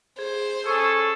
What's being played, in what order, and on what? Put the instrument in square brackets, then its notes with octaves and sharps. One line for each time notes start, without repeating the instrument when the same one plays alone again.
[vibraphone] G#4 [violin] C5
[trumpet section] C#4 G#4 A4 [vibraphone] C#6